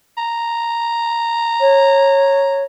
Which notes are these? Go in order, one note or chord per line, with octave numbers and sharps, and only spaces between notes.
A#5
C#5